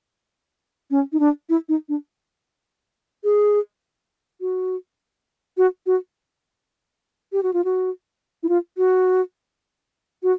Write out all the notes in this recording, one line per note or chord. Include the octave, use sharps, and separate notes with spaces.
C#4
D#4
D4
E4
D#4
D4
G#4
F#4
F#4
F#4
G4
F#4
F4
F#4
E4
F4
F#4
F#4